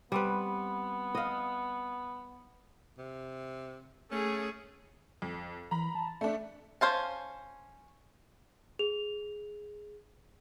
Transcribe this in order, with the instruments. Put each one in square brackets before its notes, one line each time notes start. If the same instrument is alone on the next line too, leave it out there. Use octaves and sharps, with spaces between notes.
[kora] G3 C4 B4 [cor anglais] B3
[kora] D#5 F5
[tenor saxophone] C3
[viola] A3 G#4 [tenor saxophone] C#4
[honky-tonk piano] F2
[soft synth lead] E3 [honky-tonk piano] A#5 B5
[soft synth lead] A5
[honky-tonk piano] A3 D4 [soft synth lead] E5
[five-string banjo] C#4 C5 F5 A5
[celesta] G#4 F7